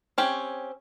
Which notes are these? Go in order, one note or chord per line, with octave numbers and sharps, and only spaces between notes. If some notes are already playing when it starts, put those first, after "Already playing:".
C4 C#4 G4